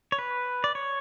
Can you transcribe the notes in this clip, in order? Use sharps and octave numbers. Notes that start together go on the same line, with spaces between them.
C#5
B4
D5
C#5